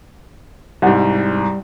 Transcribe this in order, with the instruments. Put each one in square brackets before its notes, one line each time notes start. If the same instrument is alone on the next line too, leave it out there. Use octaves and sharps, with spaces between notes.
[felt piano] C2 G#2 [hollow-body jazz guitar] G3 F#5